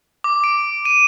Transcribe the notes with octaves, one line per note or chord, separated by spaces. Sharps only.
D6
D7
D#7